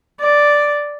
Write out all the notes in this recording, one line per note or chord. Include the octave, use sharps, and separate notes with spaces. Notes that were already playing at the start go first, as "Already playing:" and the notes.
D5